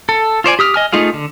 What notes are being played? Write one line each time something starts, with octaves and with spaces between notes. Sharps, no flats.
A4
F4 C5 D5 G#5
G4 D#6 F6
D#5 G#5 F6
A3 D#4 F4 G#4 F5
D3